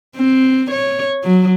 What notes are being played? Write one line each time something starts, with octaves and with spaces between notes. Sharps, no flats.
C4
C#5
F#3